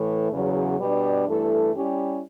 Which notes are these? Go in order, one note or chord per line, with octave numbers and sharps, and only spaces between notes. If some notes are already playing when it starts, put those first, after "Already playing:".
Already playing: A2 E3 A3
E2 C#3 F#3
B2 G3 B3 D4
G2 E3 A3 E4 A4
G3 C#4 E4 G4